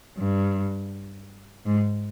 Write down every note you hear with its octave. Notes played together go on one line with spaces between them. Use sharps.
G2
G#2